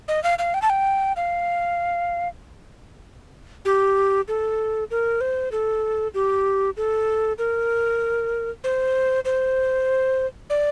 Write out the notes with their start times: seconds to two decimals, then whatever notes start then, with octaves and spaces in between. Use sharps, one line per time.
0.08 D#5
0.24 F5
0.39 F5
0.54 G5
0.62 A5
0.70 G5
1.16 F5
3.65 G4
4.28 A4
4.91 A#4
5.21 C5
5.52 A4
6.14 G4
6.77 A4
7.38 A#4
8.64 C5
9.25 C5
10.50 D5